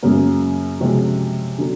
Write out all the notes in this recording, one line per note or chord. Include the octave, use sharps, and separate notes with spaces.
F#2 C#3 F#3 A#3 C#4
C3 F3 G#3 C#4 F#4
D3 F#3